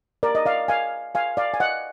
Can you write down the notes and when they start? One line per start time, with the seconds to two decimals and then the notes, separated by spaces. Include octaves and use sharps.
0.23 A#4 D5
0.35 D#5
0.45 D5 F5
0.68 F5 G#5
1.15 F5 G#5
1.37 D5 F5
1.54 G#5
1.60 D#5 F#5